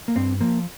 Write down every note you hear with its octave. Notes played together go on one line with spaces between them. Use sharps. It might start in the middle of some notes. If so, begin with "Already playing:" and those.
A#3
G2 C4
F3 A#3